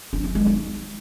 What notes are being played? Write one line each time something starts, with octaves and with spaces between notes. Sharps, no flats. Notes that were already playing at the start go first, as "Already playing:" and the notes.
D4
C#4
G#3
D#4